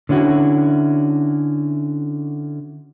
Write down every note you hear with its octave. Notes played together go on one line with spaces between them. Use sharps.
D3 C#4 E4 F#4